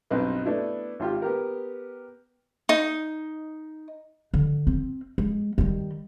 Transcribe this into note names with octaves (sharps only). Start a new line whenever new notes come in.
B1 G2 C4 B4 D#5
A3 B3 D4 E4
G#1 F4 G4
B3 G4 A#4
D#4
D3
C4
G#3
D#3 G3